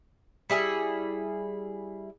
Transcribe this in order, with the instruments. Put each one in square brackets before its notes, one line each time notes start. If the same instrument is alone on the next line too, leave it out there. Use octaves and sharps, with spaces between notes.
[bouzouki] G3 E4 G#4 E5